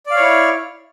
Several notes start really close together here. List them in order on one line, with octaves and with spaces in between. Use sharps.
D5 F5 C#5 E4